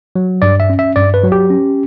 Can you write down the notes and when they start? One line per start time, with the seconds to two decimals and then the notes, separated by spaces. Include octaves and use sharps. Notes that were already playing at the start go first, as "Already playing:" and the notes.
0.16 F#3
0.42 G2 D5
0.60 E5
0.70 C#4
0.79 E5
0.96 G2 D5
1.14 B4
1.23 F#3
1.32 G4
1.50 C#4